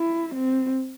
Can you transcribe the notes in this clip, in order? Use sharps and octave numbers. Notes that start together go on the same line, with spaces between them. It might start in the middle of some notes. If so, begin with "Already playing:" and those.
Already playing: E4
C4